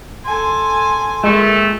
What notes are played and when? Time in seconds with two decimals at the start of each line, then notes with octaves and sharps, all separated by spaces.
0.25 A4 G#5 C6
1.24 A#2 G#3 A3